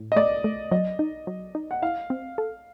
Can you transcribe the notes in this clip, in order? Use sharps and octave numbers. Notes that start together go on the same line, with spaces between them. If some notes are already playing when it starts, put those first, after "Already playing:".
Already playing: A2
D#5
A3 D5
A3
F#3 D#5
D#4
F#3
D#4
F#5
E4 F5
C4
A4